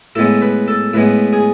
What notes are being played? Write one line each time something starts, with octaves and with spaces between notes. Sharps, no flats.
A2 G#3 B3 A4
B4
A4
A2 G#3 B3 B4
G#4